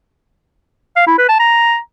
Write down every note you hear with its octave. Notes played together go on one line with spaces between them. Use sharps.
F5
E4
B4
A5
A#5